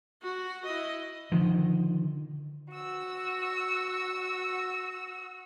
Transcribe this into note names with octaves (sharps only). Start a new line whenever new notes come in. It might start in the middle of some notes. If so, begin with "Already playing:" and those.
F#4
E4 D#5
D3 D#3 F3
F#4 E6